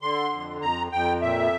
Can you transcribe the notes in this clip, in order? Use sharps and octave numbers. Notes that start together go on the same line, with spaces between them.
D3 C6
F2
F2 A#5
F2 G5
A#2 E5